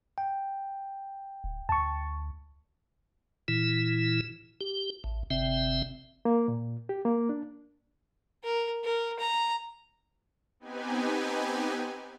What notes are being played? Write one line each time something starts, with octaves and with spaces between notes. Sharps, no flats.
G5
D1
D2 A5 C#6
A#2 E3 E4
G4
A1
G1 C3 C4 E5
A#3
A#2
G4
A#3
D4
A#4
A#4
A#5
B3 C4 D#4 G4 B4 G#5